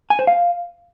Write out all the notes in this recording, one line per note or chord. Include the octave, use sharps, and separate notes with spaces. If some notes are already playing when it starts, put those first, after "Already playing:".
G#5
C5
F5